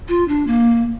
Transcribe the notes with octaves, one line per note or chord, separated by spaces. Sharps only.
F4
D4
A#3